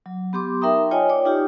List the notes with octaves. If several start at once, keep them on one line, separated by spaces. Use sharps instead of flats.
F#3
B3 G4 C6 D6
D#4 A#4 E5 G5 A#5 D#6
F4 C#5 D#5 G5 G#5
C#5 D5 G5 D6
D#4 F4 G4